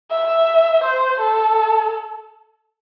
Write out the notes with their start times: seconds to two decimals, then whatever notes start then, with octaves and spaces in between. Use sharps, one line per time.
0.11 E5
0.83 C5
1.20 A4